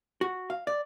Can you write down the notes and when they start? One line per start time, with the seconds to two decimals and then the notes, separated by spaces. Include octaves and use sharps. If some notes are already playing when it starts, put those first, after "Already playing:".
0.21 F#4
0.50 F5
0.67 D5